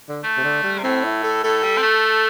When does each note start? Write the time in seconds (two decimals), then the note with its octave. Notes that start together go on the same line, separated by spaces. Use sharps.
0.09 D3
0.24 A3
0.37 C3
0.44 D3
0.63 G3
0.79 C3
0.83 A2 C4
1.04 E4
1.23 A4
1.44 A2 A4
1.63 G3
1.77 C4
1.83 A3